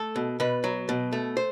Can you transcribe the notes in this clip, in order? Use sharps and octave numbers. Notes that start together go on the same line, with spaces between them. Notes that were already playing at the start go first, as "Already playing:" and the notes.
Already playing: A3 A4
B2
B2 B4
F#3
B2
A3
C5